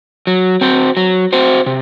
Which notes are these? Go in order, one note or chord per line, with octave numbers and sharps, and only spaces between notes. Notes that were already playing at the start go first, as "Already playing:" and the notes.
F#3
C4 F#4 C5
F#3
C4 F#4 C5
C3